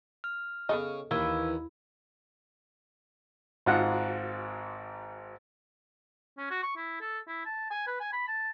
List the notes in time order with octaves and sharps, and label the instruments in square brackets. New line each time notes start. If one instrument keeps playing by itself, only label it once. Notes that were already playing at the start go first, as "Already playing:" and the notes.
[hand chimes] F6
[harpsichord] C#3 [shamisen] B3 A4 D#5
[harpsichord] D#2 [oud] E3 [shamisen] A#3 [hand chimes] F5 E6 G#6
[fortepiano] G#1 G#2 F4 F#4 F#5 F#6
[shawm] C#4
F#4
C#6
E4
A4
E4
A5
G#5
B4
G#5
B5
A5